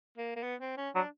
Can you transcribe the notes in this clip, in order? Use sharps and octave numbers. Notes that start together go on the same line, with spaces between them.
A#3
A#3
B3
C4
C#4
F#3 D4